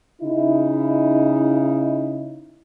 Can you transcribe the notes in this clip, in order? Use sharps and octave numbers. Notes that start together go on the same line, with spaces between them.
C#3 D#4 E4